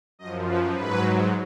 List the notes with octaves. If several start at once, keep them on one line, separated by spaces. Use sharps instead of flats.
F#2 F3 D#5
B4
G#2 F#3 B4